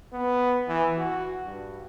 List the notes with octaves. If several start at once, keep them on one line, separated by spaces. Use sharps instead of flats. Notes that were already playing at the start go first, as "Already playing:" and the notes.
B3
E3
F#4
G2